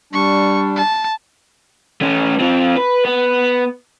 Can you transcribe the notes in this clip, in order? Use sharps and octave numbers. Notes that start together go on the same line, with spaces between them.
G3 D4 C#6
A5
A3 C#4
C4 F4
B4
B3